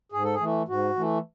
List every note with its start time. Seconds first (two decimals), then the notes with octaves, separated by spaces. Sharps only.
0.12 G#2 G#4
0.24 A4
0.34 G#4
0.40 E3 A3
0.68 G#2 F#4
0.96 E3 A3